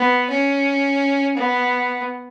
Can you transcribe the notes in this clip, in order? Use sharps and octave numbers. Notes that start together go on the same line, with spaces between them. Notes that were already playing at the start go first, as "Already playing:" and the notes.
Already playing: B3
C#4
B3